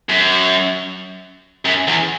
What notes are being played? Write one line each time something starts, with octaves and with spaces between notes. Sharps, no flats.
F#2
F#2
E2